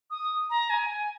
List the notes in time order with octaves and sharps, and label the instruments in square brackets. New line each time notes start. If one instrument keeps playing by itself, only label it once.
[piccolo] D#6
A#5
G#5
G#5